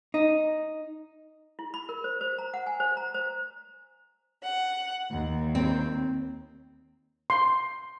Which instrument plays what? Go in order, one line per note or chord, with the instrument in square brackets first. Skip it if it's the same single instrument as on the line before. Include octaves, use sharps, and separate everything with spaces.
[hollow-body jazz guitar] D#4
[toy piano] E4
B5
A#4
C5
C5
A#5
F#5
G#5
C5
A#5
C5
[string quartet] F#5
D#2
[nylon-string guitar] C4
[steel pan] C6